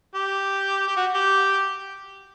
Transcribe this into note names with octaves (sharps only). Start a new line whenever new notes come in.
G4
G4
F#4
G4